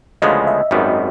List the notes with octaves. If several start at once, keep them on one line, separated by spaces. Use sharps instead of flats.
D2 C#3 F3 G#3 B3 D#5
E5
G#1 F#2 D#3 G3 B3